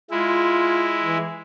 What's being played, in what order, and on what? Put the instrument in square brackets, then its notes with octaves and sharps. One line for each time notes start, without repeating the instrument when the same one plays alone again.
[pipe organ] G#3 E4 [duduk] F4
[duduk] E3